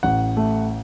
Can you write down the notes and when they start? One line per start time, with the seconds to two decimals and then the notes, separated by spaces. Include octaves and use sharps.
0.03 A1 F#5
0.37 A3